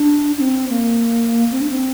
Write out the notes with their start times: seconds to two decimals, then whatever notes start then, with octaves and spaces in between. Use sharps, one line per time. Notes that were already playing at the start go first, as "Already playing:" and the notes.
Already playing: D4
0.38 D4
0.41 C4
0.70 A#3
1.52 C4
1.61 D4
1.70 C4